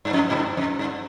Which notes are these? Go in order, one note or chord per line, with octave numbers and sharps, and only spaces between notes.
G2
F2
G#2
G2
F2
G2